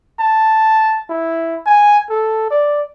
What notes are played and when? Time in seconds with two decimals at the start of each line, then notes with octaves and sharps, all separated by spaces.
0.19 A5
1.10 E4
1.66 G#5
2.10 A4
2.51 D5